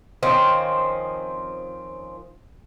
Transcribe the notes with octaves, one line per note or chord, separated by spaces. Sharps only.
D#3 F3 C4 C#4